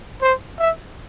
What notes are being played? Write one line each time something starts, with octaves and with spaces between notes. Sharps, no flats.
C5
E5